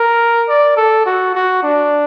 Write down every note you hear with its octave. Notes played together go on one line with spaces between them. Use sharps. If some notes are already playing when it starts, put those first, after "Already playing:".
Already playing: A#4
D5
A4
F#4
F#4
D4